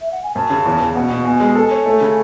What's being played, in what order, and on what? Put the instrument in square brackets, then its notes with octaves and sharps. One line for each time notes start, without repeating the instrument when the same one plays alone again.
[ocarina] E5
F#5
G#5
[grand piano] F#2 [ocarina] A5
[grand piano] C#3
E2
E2
[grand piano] B2 [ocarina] F#5
[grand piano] B2
[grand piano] B2 [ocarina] G#5
[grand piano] G#3
[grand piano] A4 [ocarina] A5
[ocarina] G#5
[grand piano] C#5
A3
C#3